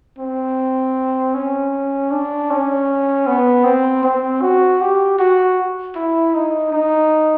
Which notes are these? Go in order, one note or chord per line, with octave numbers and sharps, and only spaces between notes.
C4
C#4
D4
C#4
B3
C4
C4
F#4
G4
F#4
E4
D#4
D#4